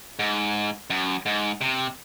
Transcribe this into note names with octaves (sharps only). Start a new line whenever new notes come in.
G#2
F#2
G#2
C3